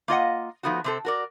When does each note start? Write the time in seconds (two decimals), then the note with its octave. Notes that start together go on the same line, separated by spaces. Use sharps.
0.08 A#3 F4 D#5 F#5
0.63 F3 A3 B3 D#4 F#4
0.84 C3 C4 A4
1.05 F#4 A#4 D5